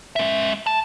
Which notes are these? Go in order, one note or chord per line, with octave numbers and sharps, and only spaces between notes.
G#3 E5
A5